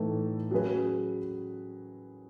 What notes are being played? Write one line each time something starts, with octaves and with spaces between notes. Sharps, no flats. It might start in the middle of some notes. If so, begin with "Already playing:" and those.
Already playing: A2 E3 A3 D#4 A4
F#3 C#4 G#4 B4